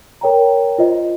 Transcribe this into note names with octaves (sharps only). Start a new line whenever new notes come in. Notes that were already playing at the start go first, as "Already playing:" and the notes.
A#4 C#5 G5 A#5
F4 C5 D#5